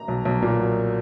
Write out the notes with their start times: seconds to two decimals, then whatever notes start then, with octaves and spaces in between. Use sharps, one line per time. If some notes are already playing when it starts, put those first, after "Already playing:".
Already playing: A#5
0.08 B1
0.25 B1
0.42 A#2
0.59 F#3